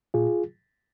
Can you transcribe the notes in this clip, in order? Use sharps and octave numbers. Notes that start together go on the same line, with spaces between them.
A#2 F4 G#4